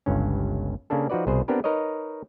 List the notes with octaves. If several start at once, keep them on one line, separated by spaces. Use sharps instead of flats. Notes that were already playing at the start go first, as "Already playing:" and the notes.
G1 C#2 G2 C#4
C#3 A#3 C#4 D4 A4
F3 D#4 F#4 B4 D5
C2 B2 G#4 B4 C5
B3 C4 D4 G4 A#4 B4
D#4 A#4 B4 C#5 D#5